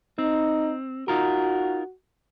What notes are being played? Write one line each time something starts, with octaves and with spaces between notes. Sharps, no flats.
C4 D#4
D#4 F4 F#4 A#4